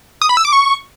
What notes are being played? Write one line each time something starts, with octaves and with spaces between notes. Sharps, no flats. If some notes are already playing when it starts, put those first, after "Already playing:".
D#6
B5
E6
D6
C#6